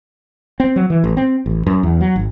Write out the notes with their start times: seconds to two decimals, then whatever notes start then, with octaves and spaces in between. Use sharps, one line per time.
0.60 C4
0.76 F#3
0.90 E3
1.04 A1
1.17 C4
1.46 A1
1.67 F#2
1.83 E2
2.01 F#3
2.16 G#1